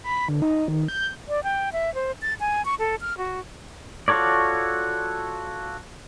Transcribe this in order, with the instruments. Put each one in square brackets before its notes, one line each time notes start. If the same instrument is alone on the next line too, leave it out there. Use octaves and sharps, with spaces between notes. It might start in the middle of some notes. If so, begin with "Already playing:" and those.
[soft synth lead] B5
D3
D#4
D#3
G6
[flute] D5
G5
E5
C5
A6
G#5
C#6
A4
F6
F#4
[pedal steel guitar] F4 F#4 A4 C#5 D5